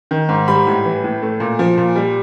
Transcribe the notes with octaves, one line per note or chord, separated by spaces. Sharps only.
D#3
G#2
G3 B5
A2
E3
A2
A3
A#2
F3
A#2
G3